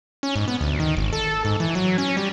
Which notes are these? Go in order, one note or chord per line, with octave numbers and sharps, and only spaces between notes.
C#4
G#2
B3
D2
D#3
G#1
A4
G#2
E3
F#3
C#4
G3